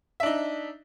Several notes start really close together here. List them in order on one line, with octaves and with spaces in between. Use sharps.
E5 D4 D#4